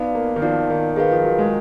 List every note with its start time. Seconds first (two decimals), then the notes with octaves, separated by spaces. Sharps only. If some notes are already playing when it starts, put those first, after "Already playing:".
Already playing: B3 D#4 F#4 D5 F5
0.15 A#3
0.36 D#3
0.42 F3 D#4 F#4 D5 F5
0.70 D#3
0.96 D#3 G#4 B4 F5
1.11 F3
1.24 F#3
1.38 G#3